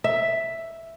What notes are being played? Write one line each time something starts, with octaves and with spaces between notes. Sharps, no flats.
E5